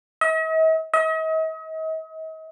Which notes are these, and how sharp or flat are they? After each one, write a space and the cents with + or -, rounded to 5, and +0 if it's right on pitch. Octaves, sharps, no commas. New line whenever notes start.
D#5 +45
D#5 +40